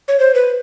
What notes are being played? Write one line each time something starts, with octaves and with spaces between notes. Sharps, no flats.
C#5
C5
B4